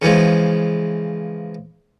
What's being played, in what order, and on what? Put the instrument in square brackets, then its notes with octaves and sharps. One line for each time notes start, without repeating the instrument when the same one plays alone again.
[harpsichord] C#3 E3 F3 G#3